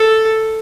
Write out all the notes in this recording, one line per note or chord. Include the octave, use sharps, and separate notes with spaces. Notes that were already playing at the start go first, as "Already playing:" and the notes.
Already playing: A4